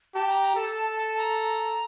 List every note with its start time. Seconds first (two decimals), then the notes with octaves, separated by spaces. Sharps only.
0.15 G4 A5
0.29 A#5
0.42 A#5
0.56 A4 A5
0.76 A5
0.97 A5
1.18 A#5